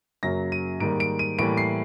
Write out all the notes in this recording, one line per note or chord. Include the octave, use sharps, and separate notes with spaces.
F#2 C#3 F#3 A#3 A#6
D#7
G#2 D#3 G3 A#3 D7
D7
D#7
A2 E3 G3 A#3 D7
C7